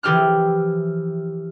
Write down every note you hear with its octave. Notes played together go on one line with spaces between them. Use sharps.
E3 F3 G4 C5 F6 F#6